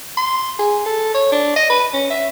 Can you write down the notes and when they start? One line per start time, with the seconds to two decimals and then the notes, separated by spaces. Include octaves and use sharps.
0.17 C6
0.59 G#4
0.86 A4
1.14 C#5
1.32 D4
1.56 D#5
1.70 B4
1.93 C#4
2.10 E5